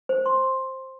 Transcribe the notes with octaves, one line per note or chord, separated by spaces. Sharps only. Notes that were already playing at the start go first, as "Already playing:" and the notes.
C5
C6